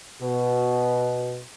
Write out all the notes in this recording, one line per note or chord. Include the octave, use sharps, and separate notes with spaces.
B2